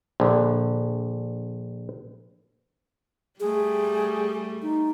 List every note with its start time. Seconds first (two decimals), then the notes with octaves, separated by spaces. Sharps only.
0.20 A#1 D3
3.40 G3 A3 G#4
4.62 D#4